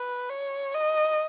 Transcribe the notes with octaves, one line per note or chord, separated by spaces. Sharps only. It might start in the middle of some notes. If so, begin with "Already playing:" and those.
Already playing: B4
C#5
D#5